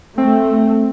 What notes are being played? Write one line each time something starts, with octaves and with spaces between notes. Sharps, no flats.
A3 C4